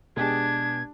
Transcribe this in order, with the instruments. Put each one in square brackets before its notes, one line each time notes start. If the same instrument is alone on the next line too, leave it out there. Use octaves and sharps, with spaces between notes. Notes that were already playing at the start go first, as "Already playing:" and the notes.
[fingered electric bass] B2 B3 [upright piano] G#3 G4 G#4 [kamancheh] D4 [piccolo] G#6